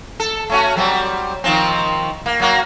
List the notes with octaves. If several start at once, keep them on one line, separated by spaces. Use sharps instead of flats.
A4
A3 C#4 F#4
F#3 G3 C4
D#3 F3 C4
A#3
F#3 A#3 F#4